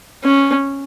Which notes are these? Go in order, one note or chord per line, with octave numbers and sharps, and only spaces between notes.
C#4